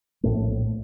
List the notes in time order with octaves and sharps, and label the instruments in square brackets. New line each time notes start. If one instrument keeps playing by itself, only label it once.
[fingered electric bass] A#1 A2 A3